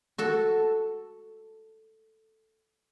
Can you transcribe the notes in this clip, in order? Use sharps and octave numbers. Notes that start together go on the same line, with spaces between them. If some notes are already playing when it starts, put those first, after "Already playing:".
F#4 A4